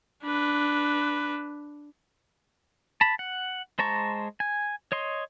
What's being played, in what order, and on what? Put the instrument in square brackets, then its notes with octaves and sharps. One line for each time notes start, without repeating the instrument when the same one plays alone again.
[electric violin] D4 B4
[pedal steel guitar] A5 B5
F#5
G#3 C5 A5 A#5 C#6
G#5
C#5 D#5 C6